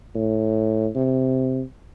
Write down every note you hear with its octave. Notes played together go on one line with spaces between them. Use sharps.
A2
C3